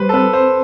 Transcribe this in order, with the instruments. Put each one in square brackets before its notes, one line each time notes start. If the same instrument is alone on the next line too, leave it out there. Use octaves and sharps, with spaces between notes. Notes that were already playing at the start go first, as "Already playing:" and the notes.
Already playing: [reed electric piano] G3 [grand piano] B4 C5
[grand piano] A4
[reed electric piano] C4 [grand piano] B4
[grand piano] C5